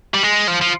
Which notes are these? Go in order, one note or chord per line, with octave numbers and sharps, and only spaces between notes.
G3
G#3
F3
F3